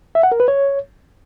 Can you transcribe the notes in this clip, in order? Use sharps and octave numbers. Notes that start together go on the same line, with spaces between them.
E5
F#5
A#4
B4
C#5